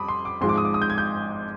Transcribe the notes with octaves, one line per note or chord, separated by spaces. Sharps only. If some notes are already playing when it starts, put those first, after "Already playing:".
Already playing: F2 G3 B5 D6 D#6
C6
D6
G#1 G#2 F3 G#3 C6
D6
D#6
D6
D#6
G6
G#6
G6